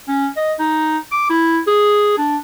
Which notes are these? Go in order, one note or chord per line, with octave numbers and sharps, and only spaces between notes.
C#4
D#5
D#4
D6
E4
G#4
D4